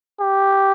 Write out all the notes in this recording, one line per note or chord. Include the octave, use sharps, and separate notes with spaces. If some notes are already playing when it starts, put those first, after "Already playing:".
G4